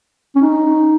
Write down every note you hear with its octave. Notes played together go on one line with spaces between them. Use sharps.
C#4
D#4